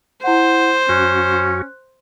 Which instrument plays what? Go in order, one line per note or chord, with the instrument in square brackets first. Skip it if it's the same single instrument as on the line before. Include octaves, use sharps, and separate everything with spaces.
[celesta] E4 F#5 [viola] C5
[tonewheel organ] F#2 F#4 [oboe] C#4 [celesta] F#6